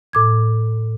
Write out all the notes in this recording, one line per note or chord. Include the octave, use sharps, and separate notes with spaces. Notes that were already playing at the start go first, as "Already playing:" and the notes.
A2 D6 G#6